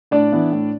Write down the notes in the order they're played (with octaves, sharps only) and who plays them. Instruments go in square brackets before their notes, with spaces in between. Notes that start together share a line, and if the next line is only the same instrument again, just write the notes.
[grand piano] A2 D4 D5
E3 B3 E4
A2